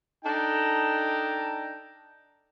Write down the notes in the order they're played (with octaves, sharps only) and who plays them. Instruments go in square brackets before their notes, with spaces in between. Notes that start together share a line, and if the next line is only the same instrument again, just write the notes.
[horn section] D4 D#4 A4 G5 A#5